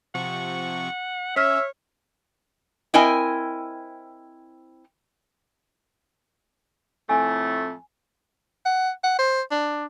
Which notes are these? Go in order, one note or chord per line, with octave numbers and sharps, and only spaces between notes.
C3 F3 F#5 C#6
C#4 C#5 E5 F6 B6
C4 E4 A#4 D#5 G5 G#5
F2 A2 A3 G#5
F#5
F#5
C5
D4